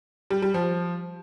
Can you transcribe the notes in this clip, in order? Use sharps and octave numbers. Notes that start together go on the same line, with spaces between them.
G3
G3
F3